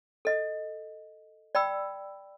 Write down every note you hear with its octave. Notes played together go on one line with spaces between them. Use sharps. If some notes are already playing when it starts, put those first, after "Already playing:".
A4 D#5
D5 G5 B5 E6